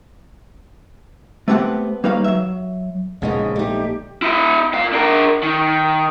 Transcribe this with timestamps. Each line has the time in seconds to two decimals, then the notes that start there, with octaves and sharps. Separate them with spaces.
1.48 A3 B3 C4 G4 F#5
2.04 G3 A#3 D#4 B4 C#5 F5
2.24 F#3 E5
3.22 A#1 A#2 C#3 G#3 B3 D#4 D#5
3.56 A3 D#4 G4
4.22 E4 D#5
4.74 A#2 F5
4.93 D4 A#4
5.43 D#3